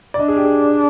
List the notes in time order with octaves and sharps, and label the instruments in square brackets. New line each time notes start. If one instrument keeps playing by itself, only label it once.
[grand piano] D5
[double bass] D4 [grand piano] D#5
[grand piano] G#4
G4
G#4